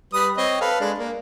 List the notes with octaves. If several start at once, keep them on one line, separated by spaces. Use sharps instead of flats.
G3 B4 D#6
C4 C#5 D#5
A4 B4 F5
G#3 D4
A#3